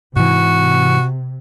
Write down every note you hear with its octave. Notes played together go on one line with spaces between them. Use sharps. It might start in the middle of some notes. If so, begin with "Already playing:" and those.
G#2 C3 E3 F#4